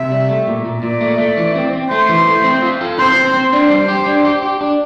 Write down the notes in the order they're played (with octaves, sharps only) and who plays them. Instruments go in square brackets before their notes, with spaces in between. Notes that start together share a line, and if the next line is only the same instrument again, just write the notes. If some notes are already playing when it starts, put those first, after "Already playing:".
Already playing: [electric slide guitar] C3 [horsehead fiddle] E5
[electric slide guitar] G3
A3
A#2
A#2
[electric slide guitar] A#2 [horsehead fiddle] D5
[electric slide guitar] A3
A3
E3
C4
C4
[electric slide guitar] A3 [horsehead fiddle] C5
[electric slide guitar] E3
A3
C4
F4
A4
[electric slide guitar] C4 [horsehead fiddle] C5
[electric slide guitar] C4
C4
[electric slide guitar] D4 [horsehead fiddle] C5
[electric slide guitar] G3
G4
D4
G4
G4
D4